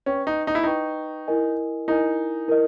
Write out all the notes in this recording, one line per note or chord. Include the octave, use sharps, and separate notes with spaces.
C#4 B4 G5 C#6
D#4
D#4
E4
D#4 B4 G5 C#6
E4 A#4 D#5 G#5
D#4 E4 A#4 D#5 G#5
E4 A#4 D#5